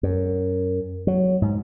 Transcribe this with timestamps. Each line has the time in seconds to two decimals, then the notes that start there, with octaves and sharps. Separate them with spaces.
0.03 F#2
1.07 F#3
1.42 G#2